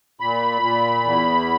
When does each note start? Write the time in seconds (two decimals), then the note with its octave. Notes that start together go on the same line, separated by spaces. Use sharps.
0.20 A#2 B5
0.62 A#2
1.03 E2